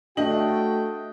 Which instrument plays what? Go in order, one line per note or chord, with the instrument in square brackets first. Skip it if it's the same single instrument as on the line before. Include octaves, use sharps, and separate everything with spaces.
[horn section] A3 F#4 G5 [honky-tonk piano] D4 D#5 F#7